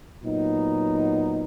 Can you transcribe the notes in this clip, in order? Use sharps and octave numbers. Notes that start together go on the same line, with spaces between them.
A#2 F#3 B3 D#4